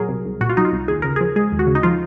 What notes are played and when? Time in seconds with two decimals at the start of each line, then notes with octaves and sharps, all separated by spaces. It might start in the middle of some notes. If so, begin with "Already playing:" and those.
Already playing: A#2 F#3 G#4 A#4
0.09 C2
0.25 C2
0.41 A#2 F#4
0.49 F4
0.57 F#3 D#4
0.65 F4
0.72 C2
0.88 D#2 G#4
1.02 C#3 A#4
1.16 F3 G#4
1.36 G#3 G#4
1.52 D#2
1.59 F#4
1.67 C#3
1.75 D#4
1.83 F3 F4